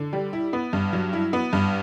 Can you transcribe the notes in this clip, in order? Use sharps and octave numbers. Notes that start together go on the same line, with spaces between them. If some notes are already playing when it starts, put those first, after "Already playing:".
Already playing: D3
G3
E4
B3
G2
F#3
E4
B3
G2